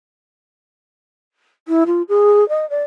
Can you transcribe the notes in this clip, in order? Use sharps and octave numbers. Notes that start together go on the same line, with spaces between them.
E4
F4
G#4
D#5
D5